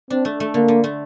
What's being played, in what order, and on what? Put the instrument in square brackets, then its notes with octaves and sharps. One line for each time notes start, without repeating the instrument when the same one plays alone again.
[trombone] C4 [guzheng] D4
[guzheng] A3
A3
[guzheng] D3 [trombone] A#3
[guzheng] D3
A3